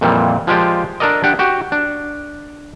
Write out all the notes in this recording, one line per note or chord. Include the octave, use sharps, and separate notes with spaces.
F2 A#2 E3 G3
F3 G#3 F4 G4 D5
D4 A4 A#4 D5 D#5
D4 G4 F#5
F#4 G4
D4